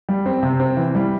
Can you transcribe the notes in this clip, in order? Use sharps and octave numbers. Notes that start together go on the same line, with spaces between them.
G3
C4
C3
C4
E3
G3